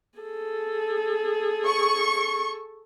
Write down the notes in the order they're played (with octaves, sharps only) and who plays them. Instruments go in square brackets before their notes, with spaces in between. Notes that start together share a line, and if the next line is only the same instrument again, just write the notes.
[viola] G#4 A4
[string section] C#6